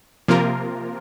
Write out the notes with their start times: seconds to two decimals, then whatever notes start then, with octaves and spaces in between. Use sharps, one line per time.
0.28 C3 F3 A#3 F4 A#4